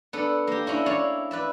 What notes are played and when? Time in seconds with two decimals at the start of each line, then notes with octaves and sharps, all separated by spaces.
0.13 B3 D4 A4 B4
0.47 A#3 G4
0.66 C#4 D4 E4 F#4
0.86 E4 C#5 D5 F5
1.31 B4 D5 E5